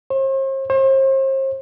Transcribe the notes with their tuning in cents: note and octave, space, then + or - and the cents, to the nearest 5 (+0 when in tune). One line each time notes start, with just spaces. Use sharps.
C5 +45
C5 +40